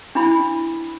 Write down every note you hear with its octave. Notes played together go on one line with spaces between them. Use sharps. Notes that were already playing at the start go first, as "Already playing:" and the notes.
D4 E4 B5